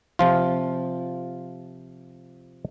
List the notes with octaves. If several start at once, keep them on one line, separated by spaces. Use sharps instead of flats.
C3 F3 F4